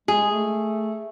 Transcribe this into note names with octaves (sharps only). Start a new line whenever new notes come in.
G#3 G#4
A3